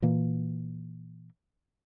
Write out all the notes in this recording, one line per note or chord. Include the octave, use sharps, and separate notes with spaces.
A#2 E3 A#3